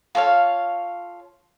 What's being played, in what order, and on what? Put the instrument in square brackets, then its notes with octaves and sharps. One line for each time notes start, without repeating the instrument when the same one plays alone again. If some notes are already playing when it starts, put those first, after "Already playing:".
[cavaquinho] F4 A4 C#5 F5